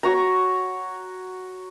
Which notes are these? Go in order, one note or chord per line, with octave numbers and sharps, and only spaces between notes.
F#4 C#5 A#5